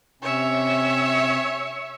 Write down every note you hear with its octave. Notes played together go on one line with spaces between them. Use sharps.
C3 C#4 C#5 E5